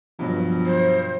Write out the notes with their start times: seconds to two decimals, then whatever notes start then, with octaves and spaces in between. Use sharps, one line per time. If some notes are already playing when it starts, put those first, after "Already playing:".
0.19 G2 B2 F3 F#3
0.66 C5